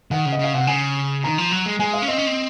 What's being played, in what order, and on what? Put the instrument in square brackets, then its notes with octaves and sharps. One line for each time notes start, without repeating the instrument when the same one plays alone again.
[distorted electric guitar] D#3 [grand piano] F#5
[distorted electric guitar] C#3
[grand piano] D#5
[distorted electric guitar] C#3
[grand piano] F5
[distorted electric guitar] C3 [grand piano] F#5
[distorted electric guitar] C#3 [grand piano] G#5
[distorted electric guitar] D#3 [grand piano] A#5
[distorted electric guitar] F3
F#3
G#3
[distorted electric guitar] G#3 [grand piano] G#5
[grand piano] F5
[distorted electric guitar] C#4
[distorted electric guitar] C4 [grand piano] D#5
[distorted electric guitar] C#4
C4